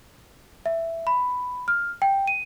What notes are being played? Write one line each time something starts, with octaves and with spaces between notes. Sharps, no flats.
E5
B5
F6
G5
D#7